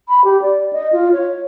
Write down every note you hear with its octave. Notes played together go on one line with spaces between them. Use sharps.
B5
G4
D5
D#5
F4
C#5